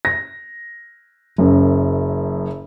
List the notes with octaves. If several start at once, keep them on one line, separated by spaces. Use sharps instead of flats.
A#6
F#1 F#2